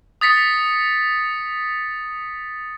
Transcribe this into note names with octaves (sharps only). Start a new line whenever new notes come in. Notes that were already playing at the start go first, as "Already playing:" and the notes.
D#6 A6 B6 C#7